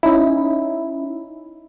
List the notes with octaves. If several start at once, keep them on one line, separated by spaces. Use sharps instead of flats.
C#4 D#4 E4